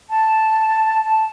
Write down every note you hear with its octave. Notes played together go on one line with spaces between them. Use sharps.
A5
A5